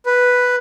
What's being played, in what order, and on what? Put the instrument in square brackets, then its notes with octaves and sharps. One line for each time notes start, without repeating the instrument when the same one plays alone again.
[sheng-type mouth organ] B4